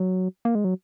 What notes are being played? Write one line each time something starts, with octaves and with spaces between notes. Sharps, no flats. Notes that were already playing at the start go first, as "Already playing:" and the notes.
Already playing: F#3
A#3
G#3
F#3